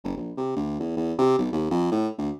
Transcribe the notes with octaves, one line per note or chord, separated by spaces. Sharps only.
F#1
A#1
C3
D2
E2
E2
C3
B1
D#2
F2
A2
D2